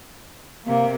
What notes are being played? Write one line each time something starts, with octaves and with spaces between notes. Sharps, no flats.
C3 A#3